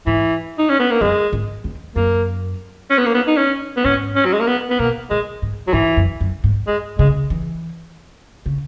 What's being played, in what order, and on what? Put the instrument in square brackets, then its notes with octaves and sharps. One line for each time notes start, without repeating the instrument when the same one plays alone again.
[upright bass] G#2 [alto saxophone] E3
[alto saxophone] D#4
C#4
B3
A#3
[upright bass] F#2 [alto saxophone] G#3
[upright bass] G#2
E2
[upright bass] F#2 [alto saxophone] A#3
[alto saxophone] C#4
B3
A#3
B3
D#4
C#4
B3
[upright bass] G#2 [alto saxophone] C#4
[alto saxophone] C#4
F#3
G#3
A#3
B3
B3
[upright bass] B2 [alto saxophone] A#3
[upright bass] A#2 [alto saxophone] G#3
[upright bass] G#2
[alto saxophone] F#3
[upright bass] G#2 [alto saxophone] E3
[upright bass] F#2
F#2
G#2
[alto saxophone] G#3
[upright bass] C#3 [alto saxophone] G#3
[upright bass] E3
C#3